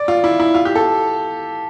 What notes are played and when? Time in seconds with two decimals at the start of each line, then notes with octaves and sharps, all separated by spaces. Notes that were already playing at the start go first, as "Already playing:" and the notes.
Already playing: D5
0.08 F4
0.24 E4
0.40 E4
0.55 F4
0.65 G4
0.76 A4